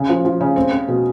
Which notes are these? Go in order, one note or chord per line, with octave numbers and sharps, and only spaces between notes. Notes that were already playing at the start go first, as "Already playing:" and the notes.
Already playing: C#3
F3
F3
C#3
C4
C4
B2